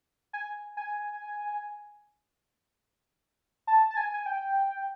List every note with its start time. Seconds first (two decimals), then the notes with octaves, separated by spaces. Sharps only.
0.33 G#5
0.77 G#5
3.67 A5
3.90 A5
3.97 G#5
4.14 G#5
4.26 G5